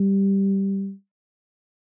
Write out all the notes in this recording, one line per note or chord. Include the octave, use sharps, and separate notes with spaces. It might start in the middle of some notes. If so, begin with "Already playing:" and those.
Already playing: G3